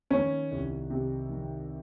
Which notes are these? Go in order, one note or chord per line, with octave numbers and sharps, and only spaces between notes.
D#3 C#4
C2
C3
D#3